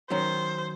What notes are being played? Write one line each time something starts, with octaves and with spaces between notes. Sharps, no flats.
D#3 F#3 C#4 C5